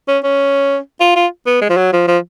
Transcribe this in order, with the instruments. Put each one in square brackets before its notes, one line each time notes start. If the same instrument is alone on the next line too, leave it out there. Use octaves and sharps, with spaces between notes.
[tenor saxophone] C#4
C#4
F4
F4
B3
G#3
F3
F#3
F3
F3